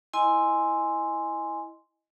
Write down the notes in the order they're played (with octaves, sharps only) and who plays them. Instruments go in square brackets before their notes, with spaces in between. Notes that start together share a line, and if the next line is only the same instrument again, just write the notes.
[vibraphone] E4 D#5 G#5 C6